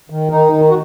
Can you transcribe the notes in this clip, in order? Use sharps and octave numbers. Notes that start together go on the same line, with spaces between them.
D#3
D#3 D#4
D#3
F#4